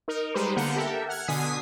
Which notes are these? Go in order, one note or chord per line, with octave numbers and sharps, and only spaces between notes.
D#4 A#4
G3 G#3 D#4 B4 C5
D3 A#3 B3 F#5 F6 G6
G4 A4 A#4 E5
F#5 F6 G#6
B2 D3 G#5 D#6 B6 C7